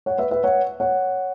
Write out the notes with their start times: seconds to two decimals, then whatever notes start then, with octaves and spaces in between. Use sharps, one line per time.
0.06 C#5 F#5
0.18 B4 E5
0.31 B4 E5
0.44 C#5 F#5
0.80 C#5 F#5